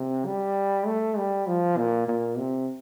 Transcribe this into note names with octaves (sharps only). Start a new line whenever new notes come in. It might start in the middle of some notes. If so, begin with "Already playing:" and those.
Already playing: C3
G3
A3
G3
F3
A#2
A#2
C3